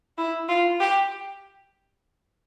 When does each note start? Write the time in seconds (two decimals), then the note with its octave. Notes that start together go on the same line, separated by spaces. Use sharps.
0.18 E4
0.49 F4
0.81 G4